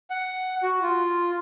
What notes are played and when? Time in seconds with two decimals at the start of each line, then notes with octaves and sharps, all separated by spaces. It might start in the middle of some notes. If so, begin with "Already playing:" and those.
0.10 F#5
0.63 F#4
0.82 F4